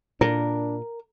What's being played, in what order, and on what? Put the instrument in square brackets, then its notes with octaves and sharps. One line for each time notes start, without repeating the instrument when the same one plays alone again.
[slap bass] A#2 [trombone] D4 [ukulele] A#4